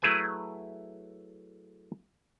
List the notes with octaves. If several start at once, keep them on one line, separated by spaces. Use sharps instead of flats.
F#3 A3 E4 G#4 B4 G#5